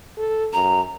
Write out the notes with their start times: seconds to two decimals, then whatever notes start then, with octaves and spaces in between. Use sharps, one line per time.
0.17 A4
0.53 F#2 A#5